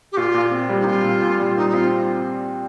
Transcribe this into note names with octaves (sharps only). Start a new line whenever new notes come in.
G4
A#2 F4
A#2
C4
G3
D#4
A#2 F4
A#2
A#2
G3
A#2 D#4
D#4
C4 F4